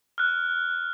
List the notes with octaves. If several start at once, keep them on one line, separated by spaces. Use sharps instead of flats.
F6 F#6